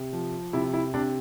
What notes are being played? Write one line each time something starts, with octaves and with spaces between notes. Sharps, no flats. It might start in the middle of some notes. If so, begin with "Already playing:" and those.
Already playing: C3
F3
C3 E4
E4
C3 D4